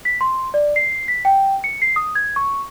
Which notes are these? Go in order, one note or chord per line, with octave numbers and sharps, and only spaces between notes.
B6
C6
D5
C7
B6
G5
C#7
C7
D#6
G#6
C#6